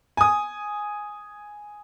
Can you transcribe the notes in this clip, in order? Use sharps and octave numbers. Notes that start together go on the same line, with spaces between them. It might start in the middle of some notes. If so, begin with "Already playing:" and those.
G#5 D#6